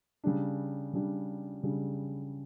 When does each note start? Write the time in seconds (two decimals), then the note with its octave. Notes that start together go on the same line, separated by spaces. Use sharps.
0.24 C#3 G3 D4
0.93 C#3 G3 D4
1.63 C#3 G3 D4